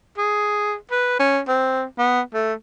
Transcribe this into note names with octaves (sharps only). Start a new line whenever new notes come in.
G#4
B4
C#4
C4
B3
A3